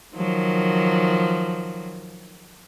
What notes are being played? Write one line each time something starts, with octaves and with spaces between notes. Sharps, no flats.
D#3 F3 F#3